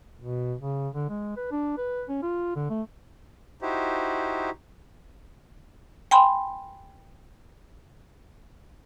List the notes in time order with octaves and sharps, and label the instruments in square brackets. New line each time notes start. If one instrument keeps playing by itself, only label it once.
[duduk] B2
C#3
D3
G#3
B4
D4
B4
C#4
F4
D3
A3
[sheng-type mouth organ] D#4 E4 F#4 G4 C5
[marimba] G5 G#5 B5 C6